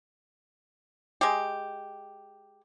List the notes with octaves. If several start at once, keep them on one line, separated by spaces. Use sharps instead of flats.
G#3 G4